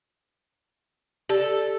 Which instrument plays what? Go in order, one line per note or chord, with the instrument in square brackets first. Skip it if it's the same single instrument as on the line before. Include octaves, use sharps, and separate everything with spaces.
[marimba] G4 D5 [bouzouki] A4